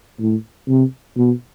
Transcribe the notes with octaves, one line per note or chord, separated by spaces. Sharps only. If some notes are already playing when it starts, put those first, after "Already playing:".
A2
C3
B2